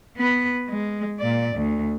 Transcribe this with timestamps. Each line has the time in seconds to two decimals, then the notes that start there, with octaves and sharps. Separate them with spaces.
0.17 B3 B4
0.69 G#3
1.20 A#2 D5
1.56 D2